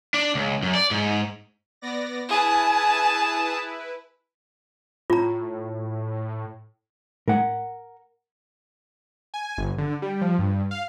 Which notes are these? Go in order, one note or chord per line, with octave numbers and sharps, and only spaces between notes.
D4
C#2
F#2
D5
G#2
B3 D5 A#6
E4 G#4 B4 G#5 A5
A2 F4 A#5
A2 A#4 F#5
G#5
G1
D3
G3
F3
G2
F5